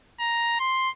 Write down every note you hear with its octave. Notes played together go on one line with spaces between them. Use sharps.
A#5
C6